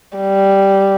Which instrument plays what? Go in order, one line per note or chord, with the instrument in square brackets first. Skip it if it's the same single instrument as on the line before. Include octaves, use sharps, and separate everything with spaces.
[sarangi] G3